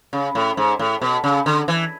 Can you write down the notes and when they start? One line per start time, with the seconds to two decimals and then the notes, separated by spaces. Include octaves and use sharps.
0.13 C#3
0.35 A2
0.57 G#2
0.79 A2
1.01 B2
1.24 C#3
1.46 D3
1.68 E3